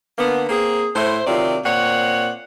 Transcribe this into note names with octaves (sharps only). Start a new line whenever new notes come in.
D3 A#3 B3
A#3 C4 G#4
A2 E4 C5
C3 D#3 F#3 F4 D5
A#2 C4 C#5 D5 F#5